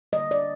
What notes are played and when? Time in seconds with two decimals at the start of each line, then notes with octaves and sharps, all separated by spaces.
0.13 D3 G3 A#3 D#5
0.31 D5